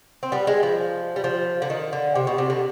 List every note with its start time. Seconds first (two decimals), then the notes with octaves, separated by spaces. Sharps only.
0.23 C4
0.32 G3 B3
0.47 G#3
0.63 F3
1.16 G3
1.24 F3
1.62 D3
1.70 D#3
1.93 D3
2.15 C3
2.27 B2
2.38 C3
2.50 D3